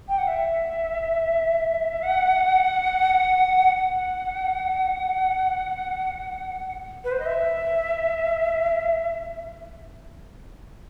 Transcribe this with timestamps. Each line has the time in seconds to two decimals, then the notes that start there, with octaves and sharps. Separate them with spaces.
0.08 G5
0.18 F#5
0.27 E5
2.02 F#5
3.77 F#5
7.04 B4
7.11 C5
7.19 D#5
7.26 E5